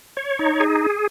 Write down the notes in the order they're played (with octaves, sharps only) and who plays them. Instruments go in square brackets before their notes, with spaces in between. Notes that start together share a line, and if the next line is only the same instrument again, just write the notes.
[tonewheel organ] C#5
D#4
G#4